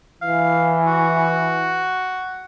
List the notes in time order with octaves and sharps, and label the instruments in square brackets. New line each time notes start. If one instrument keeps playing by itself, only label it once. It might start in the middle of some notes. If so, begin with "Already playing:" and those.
[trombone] E3 [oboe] F5
[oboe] F#4